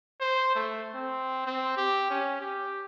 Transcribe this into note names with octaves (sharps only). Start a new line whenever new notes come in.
C5
A3
C4
C4
G4
C#4
G4